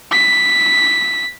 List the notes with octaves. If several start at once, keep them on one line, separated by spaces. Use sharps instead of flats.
B6